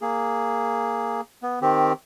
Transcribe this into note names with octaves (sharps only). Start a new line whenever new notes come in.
A#3 G#4
B3
D#3 C4 G4